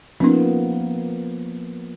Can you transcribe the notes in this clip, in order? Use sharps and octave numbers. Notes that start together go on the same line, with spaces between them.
F3 A#3 B3 C#4 D#4